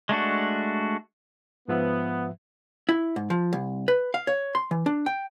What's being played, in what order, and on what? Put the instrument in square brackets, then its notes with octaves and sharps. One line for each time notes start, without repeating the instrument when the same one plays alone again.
[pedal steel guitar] G#3 A3 D4 F#4
[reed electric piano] G#2 F3 E5 [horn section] B3
[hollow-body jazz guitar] E4
G#2
F3
C2
B4
F5
C#5
C6
E3
D4
G5